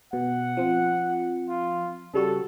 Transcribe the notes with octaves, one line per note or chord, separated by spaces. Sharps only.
B2 F#5
F3 C4
F4
C#3 G3 F#4 A4